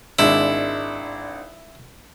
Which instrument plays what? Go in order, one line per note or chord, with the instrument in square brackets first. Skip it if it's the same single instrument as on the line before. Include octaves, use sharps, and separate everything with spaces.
[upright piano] G#1 G#3 D4 [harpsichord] E4